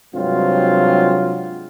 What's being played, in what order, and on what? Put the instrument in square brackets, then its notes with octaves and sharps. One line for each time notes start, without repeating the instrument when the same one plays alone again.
[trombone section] G2 C3 F#3 G#3 C4 F4